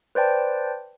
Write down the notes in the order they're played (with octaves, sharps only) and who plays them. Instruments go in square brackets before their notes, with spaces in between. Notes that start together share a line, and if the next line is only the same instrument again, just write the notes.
[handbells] B4 C5 D5 G5 A5